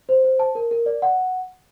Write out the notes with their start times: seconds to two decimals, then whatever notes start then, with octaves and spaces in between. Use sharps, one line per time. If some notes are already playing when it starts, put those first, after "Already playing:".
0.09 C5
0.24 C5
0.39 A5
0.55 A#4
0.71 A#4
0.86 D5
1.02 F#5